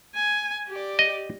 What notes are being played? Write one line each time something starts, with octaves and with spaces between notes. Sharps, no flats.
G#5
G4 D5
D#5